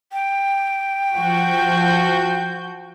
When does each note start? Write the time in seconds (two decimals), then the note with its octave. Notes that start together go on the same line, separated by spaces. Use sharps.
0.13 G5
1.16 F3 F#4 G6